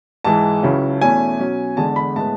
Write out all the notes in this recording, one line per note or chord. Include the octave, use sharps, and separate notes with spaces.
G#2 E3 G#3 A5
C#2 C#3 F#3 C#4 E4
E2 B2 A3 C#4 E4 G#5
B2 F#3 C#4
E2 D3 G#3 A5
B5
A2 G#3 B3 A5